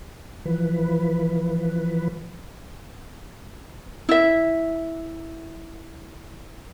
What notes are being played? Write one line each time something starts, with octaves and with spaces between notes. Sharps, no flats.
E3 F3 B4
E4 E5